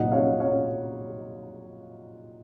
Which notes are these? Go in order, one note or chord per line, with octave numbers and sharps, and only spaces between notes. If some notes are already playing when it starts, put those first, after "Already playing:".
Already playing: C2 A#2 F#3 C4 D#4 D#5 F#5
C#5 F5
C#5 F5